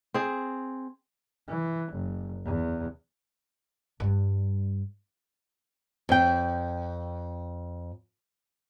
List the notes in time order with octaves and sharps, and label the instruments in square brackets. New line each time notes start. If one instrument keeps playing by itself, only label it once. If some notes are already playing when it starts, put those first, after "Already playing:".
[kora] C4 G#4
[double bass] E3
F#1
E2
[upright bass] G2 G3
[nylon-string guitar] F2 G5